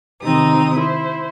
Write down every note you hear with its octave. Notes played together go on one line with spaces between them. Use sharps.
C3 D#3 C4 D#4 D#6
E4 C5